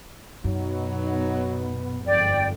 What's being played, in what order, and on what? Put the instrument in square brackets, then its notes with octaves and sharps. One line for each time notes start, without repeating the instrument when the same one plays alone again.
[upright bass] F#2 [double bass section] B2 B3 [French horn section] F#3 D#4
[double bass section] G1 F2 G#2 [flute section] D5 G5